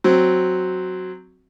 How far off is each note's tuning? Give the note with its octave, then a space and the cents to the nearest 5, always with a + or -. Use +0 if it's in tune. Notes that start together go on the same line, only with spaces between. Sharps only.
F#3 +0 C4 +0